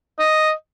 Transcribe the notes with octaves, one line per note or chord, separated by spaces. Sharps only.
D#5